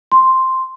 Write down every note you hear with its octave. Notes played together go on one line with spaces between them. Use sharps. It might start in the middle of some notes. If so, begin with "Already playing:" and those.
C6